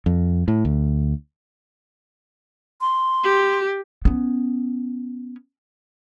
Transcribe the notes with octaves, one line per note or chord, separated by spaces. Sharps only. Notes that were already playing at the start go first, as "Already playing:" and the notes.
F2
A2
D2
C6
G4
B3 C#4